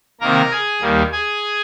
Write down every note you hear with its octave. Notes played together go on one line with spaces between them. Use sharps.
C3 D#3 A#3 A#4 A#5
G#4 G#5
D#2 D#3 G3 A#3
G#4 G#5